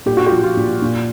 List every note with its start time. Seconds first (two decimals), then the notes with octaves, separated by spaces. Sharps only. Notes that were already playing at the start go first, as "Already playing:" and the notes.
0.06 A#2 G4
0.17 F#4
0.27 F3 F4 G4
0.43 F4
0.57 A#2
0.82 A#2